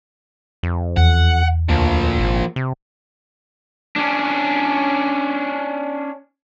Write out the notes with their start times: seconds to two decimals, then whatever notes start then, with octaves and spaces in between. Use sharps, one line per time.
0.63 F2
0.97 E2 F#5
1.69 D2 F3 A#3
2.19 G#1
2.56 C3
3.96 C#4 D4